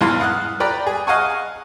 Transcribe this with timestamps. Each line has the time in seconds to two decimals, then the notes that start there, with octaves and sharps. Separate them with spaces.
0.01 E2 G#2 E3 E4 F5 C6
0.20 F5 F#5 D#6 F6 F#6
0.60 B4 D5 G5 A#5 B5
0.87 G#4
1.07 D#5 F5 F#5 G#5 C#6